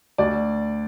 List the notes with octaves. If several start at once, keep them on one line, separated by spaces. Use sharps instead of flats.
D2 D5